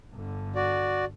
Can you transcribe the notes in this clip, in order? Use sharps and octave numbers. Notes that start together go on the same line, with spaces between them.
G1 D3
F#4 D5